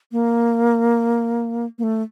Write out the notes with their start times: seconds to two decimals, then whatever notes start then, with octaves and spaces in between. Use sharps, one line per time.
0.12 A#3
1.78 A#3
1.83 A3